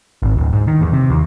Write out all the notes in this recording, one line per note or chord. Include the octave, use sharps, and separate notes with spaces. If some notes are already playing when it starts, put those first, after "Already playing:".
G#1
D1
G#2
D#3
E2
C3
D#2